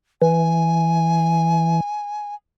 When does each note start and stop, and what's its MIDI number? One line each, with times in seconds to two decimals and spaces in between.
0.22 1.80 52
0.22 2.35 80